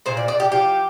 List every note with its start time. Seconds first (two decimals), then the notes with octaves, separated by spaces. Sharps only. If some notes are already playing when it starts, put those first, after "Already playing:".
0.06 A#2 C5
0.17 D5
0.28 A#2 D5
0.40 G4
0.51 F3 G4